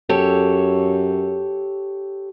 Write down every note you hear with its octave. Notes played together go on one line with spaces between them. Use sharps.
F#2 G4 A4 C#5